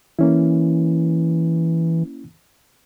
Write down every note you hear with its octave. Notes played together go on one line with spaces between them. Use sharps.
E3 A#3 C#4 E4